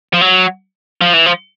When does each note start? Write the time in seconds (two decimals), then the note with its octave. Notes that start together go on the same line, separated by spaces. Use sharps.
0.13 F3
0.21 F#3
1.01 F3
1.13 E3
1.26 F3